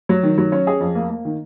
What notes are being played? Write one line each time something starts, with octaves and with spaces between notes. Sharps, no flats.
F#3
D#3
F#3
C#4
G#4
F2
A#3
A#3
D#3